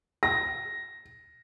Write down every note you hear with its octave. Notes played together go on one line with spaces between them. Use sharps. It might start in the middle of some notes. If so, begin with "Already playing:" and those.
A#6